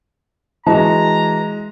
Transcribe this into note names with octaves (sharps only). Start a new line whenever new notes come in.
E3 G#3 F#4 A5 A#5